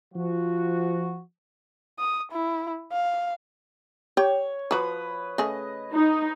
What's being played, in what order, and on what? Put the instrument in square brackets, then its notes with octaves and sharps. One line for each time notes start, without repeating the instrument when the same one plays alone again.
[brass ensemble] F3 F#4
[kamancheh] D#6
E4
F5
[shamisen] G4 G5 [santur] C#5
[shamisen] F3 F#4 [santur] B4 D#6
[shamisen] C#3 A3 G#4 [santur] D#5
[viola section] D#4